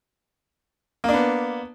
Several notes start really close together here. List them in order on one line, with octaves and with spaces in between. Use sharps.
A#3 D4 B3